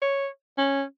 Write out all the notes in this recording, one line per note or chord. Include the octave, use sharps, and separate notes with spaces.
C#5
C#4